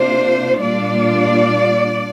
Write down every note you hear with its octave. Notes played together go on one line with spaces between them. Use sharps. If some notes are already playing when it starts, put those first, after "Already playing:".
Already playing: C3 A#3 D4 F4 C5
A#2 G3 D4 F4 D5